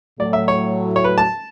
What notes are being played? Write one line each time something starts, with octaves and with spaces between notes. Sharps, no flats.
A2 F#3 A3 D5
E5
C#5
C#5
B4
A5